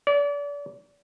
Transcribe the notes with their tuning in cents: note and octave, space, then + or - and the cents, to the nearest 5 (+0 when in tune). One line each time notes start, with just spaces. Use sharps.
D5 -35